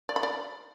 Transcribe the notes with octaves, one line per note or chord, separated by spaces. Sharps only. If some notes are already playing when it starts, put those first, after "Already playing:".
D5
B5
D5